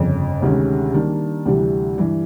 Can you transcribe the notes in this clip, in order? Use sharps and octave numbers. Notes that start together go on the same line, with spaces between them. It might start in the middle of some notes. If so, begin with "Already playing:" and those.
Already playing: G1 F2 C#3
D2 C3 D#3 G#3 C#4
D#3 G3 A#3 D4
D2 C3 E3 G3
G2 E3 G3